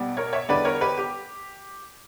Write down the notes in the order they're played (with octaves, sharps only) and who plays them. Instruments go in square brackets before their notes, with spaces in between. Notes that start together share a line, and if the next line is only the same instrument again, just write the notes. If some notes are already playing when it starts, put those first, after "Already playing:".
Already playing: [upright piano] B1 B2 G3 B3
A#4 C#5
C#5 E5
E2 D3 G3 B4 D5
A#4 C#5
G4 B4
G4